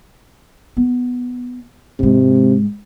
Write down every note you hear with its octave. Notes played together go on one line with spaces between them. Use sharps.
B3
G#2 C3 G#3